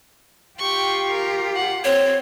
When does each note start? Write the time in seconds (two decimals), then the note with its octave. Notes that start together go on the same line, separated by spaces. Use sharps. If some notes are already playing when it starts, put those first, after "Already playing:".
0.59 F4 G4 G5 C#6
1.10 A#4
1.55 F#5
1.85 C4 C#5